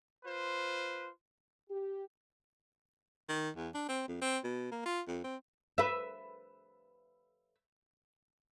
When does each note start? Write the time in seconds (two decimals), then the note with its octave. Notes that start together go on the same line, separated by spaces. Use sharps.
0.25 F4 B4 C5
1.69 G4
3.29 D#3
3.56 E2
3.74 D4
3.88 C4
4.08 F2
4.21 C4
4.44 B2
4.72 A#3
4.86 F4
5.08 F2
5.24 C4
5.78 B4 E5